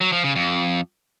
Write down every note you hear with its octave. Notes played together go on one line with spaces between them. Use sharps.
F#3
F3
C#3
F2